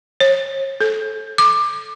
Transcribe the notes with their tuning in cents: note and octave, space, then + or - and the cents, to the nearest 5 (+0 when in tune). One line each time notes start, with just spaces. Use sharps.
C#5 -40
A4 -10
D6 +20